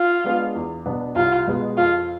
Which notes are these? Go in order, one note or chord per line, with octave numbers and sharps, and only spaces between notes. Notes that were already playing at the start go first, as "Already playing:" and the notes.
Already playing: F4
G#3 B3 D4 G#4
E2
B2 B3 D4
C2 F4
B2 G#3 B3
F2 F4